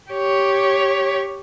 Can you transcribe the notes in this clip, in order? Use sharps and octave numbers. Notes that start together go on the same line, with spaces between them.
G4 C#5